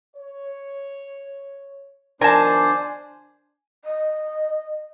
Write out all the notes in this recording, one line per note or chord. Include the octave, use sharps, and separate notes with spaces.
C#5
D#3 F3 B3 D4 A#4 C5 G#5 A5
D#5